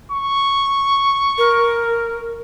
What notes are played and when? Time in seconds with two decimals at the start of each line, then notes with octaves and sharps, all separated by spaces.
0.12 C#6
1.38 A#4